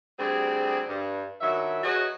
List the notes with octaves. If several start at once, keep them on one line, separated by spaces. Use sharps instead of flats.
D2 G3 C4 G#4
G2
G2 D#3 F#3 E5
F#3 F#4 G#4 B4 C#5 D#5